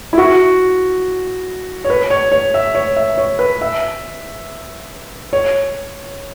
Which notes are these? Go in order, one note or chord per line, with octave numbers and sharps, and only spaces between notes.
E4
F#4
C#5
B4
C#5
C#5
E5
C#5
E5
C#5
B4
E5
C#5